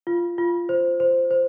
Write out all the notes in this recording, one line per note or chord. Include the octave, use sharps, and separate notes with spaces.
F4
F4
C5
C5
C5